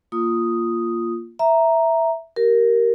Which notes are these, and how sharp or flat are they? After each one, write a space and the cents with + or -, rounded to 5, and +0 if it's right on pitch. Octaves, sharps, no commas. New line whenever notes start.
A#3 +0 F4 -10 D#6 +0
E5 +0 A#5 +0
G4 -25 A#4 +0